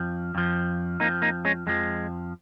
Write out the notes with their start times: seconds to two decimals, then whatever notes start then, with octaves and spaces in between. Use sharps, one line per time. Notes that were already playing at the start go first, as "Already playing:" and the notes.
Already playing: F2 F3
0.35 F2 F3
1.00 F2 F3 A#3 D#4
1.22 A#3 D#4
1.45 G#3 C#4
1.67 F2 F3 G#3